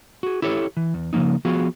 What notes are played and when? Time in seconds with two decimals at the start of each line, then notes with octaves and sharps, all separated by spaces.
0.23 F#4 G#4
0.42 E4 G4 A4 C#5
0.77 E3
0.94 E2
1.13 C#3 F3 F#3 A#3 D#4
1.45 F3 B3 F4 F#4 G#4